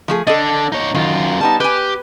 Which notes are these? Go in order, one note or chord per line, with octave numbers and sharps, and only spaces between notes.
F3 A3 G#4
D3 D4 A4 D#5
D#4 C#5
F#2 D#3 F4
G3 B3 D#4 A5
G4 B4 G#5